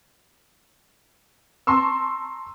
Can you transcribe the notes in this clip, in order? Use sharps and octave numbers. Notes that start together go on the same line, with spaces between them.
A5 A#5 C6 C#6 E6